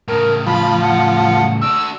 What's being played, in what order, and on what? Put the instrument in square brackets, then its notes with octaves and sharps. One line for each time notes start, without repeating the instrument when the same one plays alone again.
[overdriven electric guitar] A2 C#3 [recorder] A#4
[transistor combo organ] F3 [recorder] B5
[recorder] F#5
[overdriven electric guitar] D4 F#4 [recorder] E6